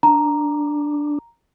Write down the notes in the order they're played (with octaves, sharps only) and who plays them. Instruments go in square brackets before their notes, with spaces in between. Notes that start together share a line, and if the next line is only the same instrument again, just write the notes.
[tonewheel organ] D4 [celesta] A#5